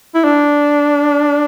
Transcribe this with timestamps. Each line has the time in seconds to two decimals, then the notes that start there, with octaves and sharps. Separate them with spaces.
0.15 E4
0.24 D4